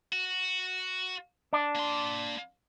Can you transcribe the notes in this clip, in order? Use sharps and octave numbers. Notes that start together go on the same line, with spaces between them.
F#4
D4
A#3 C6